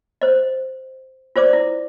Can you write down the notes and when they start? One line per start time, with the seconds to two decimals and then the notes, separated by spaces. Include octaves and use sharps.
0.21 C5 D#5
1.36 F4 C5 D5 D6
1.53 E4